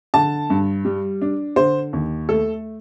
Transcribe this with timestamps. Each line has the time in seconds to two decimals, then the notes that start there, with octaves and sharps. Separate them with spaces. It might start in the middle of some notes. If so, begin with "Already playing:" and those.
0.14 D3 A5
0.50 G2
0.85 G3
1.22 D4
1.56 D3 C5
1.93 D#2
2.29 A3 A4